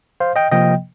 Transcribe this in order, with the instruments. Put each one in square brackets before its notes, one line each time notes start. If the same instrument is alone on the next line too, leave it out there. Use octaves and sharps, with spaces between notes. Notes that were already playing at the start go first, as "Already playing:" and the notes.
[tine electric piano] C5 F5
D#5 G5
C3 F3 A#3 D#5 G5